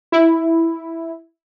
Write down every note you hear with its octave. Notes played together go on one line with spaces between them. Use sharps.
E4